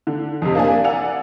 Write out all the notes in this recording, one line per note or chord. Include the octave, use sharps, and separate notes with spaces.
D3
F2 C3
A#3 D4 G#5
D5 F#5 G#5 E6 F7